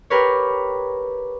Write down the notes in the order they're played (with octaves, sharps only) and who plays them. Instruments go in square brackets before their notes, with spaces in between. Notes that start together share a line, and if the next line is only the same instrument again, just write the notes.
[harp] G4 A#4 B4 C#5